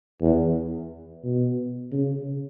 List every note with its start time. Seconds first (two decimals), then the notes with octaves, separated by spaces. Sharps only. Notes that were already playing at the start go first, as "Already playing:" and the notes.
0.22 E2
1.24 B2
1.92 C#3